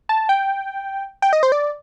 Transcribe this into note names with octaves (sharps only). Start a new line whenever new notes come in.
A5
G5
G5
D#5
C5
D5